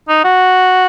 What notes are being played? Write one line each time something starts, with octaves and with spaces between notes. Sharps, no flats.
D#4
F#4